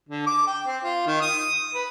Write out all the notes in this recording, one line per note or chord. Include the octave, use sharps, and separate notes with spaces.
D3
D6
G5
C4
F4
D#3
D#6
B4